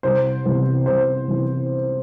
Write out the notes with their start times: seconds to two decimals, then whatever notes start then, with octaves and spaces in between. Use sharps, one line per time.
0.03 C2 C5
0.45 C3 E3 B3
0.86 C2 C5
1.28 C3 E3 B3